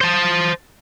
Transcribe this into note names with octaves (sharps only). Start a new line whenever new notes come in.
C5 A5